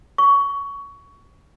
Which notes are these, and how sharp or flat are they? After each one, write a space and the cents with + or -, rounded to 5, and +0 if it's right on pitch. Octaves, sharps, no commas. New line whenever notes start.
C#6 +20